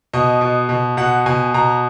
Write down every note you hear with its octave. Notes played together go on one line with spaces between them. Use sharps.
B2 D#5
B2
B2
B2 F#5
B2 G#5
B2 A#5